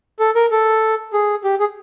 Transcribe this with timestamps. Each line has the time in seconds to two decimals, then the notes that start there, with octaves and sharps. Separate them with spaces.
0.19 A4
0.35 A#4
0.51 A4
1.13 G#4
1.44 G4
1.60 G#4